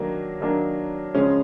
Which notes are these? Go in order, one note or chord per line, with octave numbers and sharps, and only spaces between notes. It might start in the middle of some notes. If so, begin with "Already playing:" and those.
Already playing: D#3 F#3 A#3 D4
D#3 F#3 A#3 D4
C#3 F3 G#3 C#4